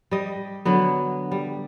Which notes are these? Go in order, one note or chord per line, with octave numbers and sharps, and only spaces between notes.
G3 D#5
D3 F#3 B3
G3